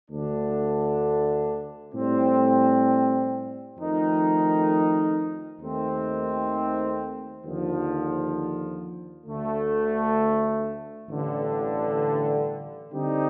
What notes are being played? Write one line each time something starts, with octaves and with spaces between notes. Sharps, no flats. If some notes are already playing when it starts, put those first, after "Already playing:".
D2 D3 A3 D4
A2 G3 C4
F2 D#3 A3 D#4 A#4
D#2 D#3 A3 C4
D#2 D3 F3
D2 D3 A3
A1 G2 D3
D3 G3 C4 D#4 G4